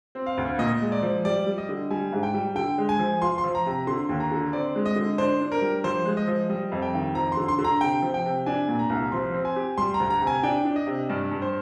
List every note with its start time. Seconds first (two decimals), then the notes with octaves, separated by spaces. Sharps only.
0.15 C4
0.26 F5
0.37 D2
0.59 A#2 D#5
0.81 G#3
0.92 D5
1.02 F3
1.25 G3 D5
1.46 G3
1.58 D#5
1.69 D3
1.90 G3 G#5
2.12 G#2
2.23 G5
2.34 G3
2.55 D3 G5
2.78 G#3
2.89 G#5
2.99 F3
3.22 F4 C6
3.38 C6
3.44 F3
3.55 A#5
3.66 C3 A#5
3.87 D3 C6
4.09 D#2
4.20 A#5
4.32 D3
4.53 C4 D5
4.75 G#3
4.86 D#5
4.96 D3
5.18 D4 C5
5.41 D4
5.52 A#4
5.62 G3
5.84 F3 C5
6.06 G#3
6.17 D#5
6.27 F3
6.49 G3 D#5
6.72 F2
6.82 G5
6.94 D#3
7.15 F3 A#5
7.32 C6
7.37 D3
7.48 C6
7.58 D3
7.64 A#5
7.81 C3 G5
8.02 F3
8.14 G5
8.25 C3
8.46 D4 G#5
8.68 A#2
8.79 A#5
8.90 C2
9.12 F3 C6
9.34 C4
9.45 G#5
9.56 G4
9.78 G3 C6
9.94 A#5
10.00 D2
10.10 A#5
10.21 C3
10.27 G#5
10.43 D4 G5
10.65 D4
10.76 D#5
10.87 C3
11.09 G2 D5
11.31 G2
11.42 C5